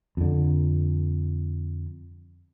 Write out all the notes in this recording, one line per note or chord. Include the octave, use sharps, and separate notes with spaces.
F2 D3